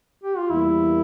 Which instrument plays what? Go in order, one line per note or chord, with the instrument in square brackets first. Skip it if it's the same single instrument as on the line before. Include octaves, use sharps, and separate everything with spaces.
[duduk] G4
F4
[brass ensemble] E2 E3 G3 A#3 [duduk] E4